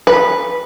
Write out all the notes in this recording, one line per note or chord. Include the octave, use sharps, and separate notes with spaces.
B4